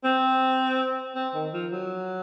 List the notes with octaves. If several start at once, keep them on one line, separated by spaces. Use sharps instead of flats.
C4
C4
D#3
F3
F#3